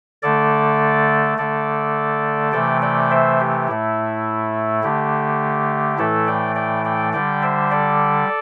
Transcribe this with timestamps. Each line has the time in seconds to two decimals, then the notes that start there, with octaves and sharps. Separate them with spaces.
0.23 D3 A3 A4 D5
1.38 D3 A3 A4 D5
2.52 C3 E3 A3 D5 G5
2.82 D5 G5
3.11 C5 E5
3.40 G4
3.68 A2 A3 E4
4.83 D3 A3 G4
5.98 A2 E3 A3 E4 A4
6.27 D5 G5
6.55 D5 G5
6.85 D5 G5
7.13 D3 G3 D5 G5
7.42 C5 E5
7.71 A4 D5